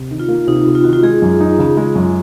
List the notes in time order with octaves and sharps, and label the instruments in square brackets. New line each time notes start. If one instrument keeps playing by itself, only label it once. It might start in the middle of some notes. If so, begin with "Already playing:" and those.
Already playing: [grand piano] C3
D#3
[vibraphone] F4
[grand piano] A#3
[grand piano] C3 [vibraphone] D#4
[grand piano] C3
[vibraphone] F4
[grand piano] D#3 [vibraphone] F#4
[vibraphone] F4
[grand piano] G#3 [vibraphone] G#4
[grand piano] F#2
D#4
C#3
G#3
F#2